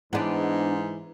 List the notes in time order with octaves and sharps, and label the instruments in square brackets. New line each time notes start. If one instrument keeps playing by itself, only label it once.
[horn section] G#2 [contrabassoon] E3 [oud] B3 D4